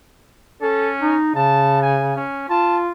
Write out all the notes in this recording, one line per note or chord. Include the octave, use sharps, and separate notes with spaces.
C#4 A4
D#4
C#3 A5
G#5
C#4
F4 A5